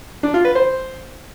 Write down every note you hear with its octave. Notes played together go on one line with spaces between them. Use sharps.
D4
F4
B4
C5